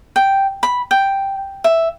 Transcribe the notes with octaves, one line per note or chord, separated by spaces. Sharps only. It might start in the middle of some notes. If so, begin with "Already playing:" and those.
G5
B5
G5
E5